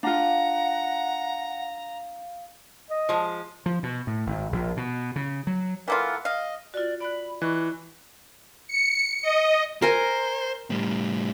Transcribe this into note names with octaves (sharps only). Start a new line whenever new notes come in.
D4 F4 F5 F#5 A#5
D#5
F3 G#3
F3
B2
A2
G#1
A#1
B2
C#3
F#3
E3 A#3 F4 A4 A#4 F#5
D#5 F5
F4 F#4 D5
D5 B5 F#6
E3 D#5 B5 C#6 F#6
C#7
D#5
A#4 C5 G#5
A2 G3